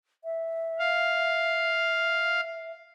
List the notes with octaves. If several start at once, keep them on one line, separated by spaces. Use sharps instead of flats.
E5
F5